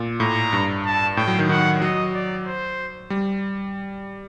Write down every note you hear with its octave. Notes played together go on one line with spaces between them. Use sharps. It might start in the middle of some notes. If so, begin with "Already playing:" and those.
Already playing: A#2
A2 A#5
G2
A5
A2 G5
F#3
D#3
D#3 F#5
F#3 D#5
D5
C5
G3